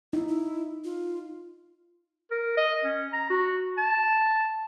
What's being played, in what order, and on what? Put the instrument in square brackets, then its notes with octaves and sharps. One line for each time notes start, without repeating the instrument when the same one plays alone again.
[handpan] D#4 [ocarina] E4
[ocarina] E4
F4
[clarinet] A#4
D#5
C#4
A#5
F#4
A5